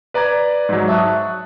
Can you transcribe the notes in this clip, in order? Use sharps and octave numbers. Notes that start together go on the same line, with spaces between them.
B4 D5 A#5 D6 G#6
G#2 F#3
E5 A5 C#6 D#6 F#6